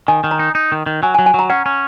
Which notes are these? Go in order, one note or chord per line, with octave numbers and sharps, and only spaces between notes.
D#3 G#5
D#3
A#5
D#4
D#4
D#3
D#3
F#3 G#5
G#5
F#3
G#5
F#3 A#5
C#4 F#5
C#4